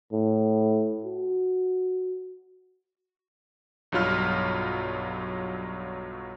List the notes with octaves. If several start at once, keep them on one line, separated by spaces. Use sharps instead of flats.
A2
F#4
B1 G2 F#3 F4 F6